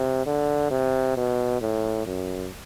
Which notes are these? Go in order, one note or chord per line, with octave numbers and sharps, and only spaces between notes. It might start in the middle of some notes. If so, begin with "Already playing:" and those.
Already playing: C3
D3
C3
B2
A2
F#2